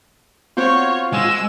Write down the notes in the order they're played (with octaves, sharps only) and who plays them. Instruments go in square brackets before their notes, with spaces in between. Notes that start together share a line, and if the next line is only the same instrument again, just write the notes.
[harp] C4 F#4 C5 [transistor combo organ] F4 [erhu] C#5
[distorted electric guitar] G#3 [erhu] E6